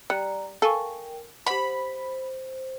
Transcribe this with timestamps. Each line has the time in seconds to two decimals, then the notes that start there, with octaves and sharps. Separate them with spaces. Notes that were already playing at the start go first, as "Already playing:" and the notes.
0.10 G3 D5 A#5 F#6 C#7
0.62 A4 A#4 F5 G5 G#5 C#6
1.46 G4 C5 F#5 B5